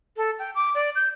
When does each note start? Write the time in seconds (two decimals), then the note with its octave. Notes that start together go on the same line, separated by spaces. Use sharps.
0.17 A4
0.39 G5
0.55 D6
0.75 D5
0.95 G6